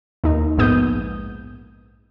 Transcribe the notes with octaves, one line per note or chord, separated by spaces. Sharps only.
D#2 D#4
A#1 G#2 B3 D#6 G6